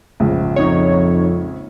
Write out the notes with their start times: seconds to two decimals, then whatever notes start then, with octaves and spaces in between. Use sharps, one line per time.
0.20 A#1 G#2 C#3
0.56 F2 D#4 C#5